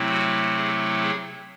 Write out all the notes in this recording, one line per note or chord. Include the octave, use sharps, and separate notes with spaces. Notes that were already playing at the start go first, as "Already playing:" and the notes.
Already playing: C3 F#3 A3 C4 E4
F#4
G#4
G#4